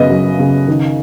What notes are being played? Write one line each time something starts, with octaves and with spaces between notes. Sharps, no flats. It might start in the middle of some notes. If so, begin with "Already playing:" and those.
Already playing: F#2 C#3 B4 D#5
F#2
C#3
D#3